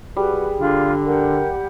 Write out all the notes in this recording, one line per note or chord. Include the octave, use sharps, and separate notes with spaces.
G3 F#4 G#4 B4
D3 F4
G4 A#4 F#5